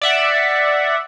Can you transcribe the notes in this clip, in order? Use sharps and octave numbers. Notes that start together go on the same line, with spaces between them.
D5 E5 F#5